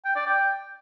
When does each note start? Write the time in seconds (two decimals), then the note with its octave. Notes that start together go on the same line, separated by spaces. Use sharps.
0.05 G5
0.16 D5
0.26 G5